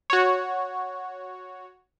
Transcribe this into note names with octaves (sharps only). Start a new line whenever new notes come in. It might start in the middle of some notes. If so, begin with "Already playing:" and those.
F#4 C#5